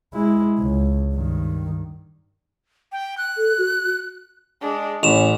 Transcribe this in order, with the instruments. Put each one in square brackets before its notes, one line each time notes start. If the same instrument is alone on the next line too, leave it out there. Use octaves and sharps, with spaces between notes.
[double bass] G#3 E4
C#2
G2 D#3
[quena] G5
F#6
[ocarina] A4
F#4
[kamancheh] G#3 D4
[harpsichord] A1 [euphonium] C#4 [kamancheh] E4 F#5 [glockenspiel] E7 F7